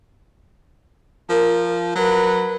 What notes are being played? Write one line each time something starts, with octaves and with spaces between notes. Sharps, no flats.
F3 A#4
F#3 A#4 B4